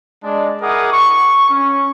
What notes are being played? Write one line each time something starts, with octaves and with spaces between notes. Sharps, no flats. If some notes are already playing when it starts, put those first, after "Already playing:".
G#3 D4
E4 G#4 A#4 F#5 D6 D#6
C#6
C#4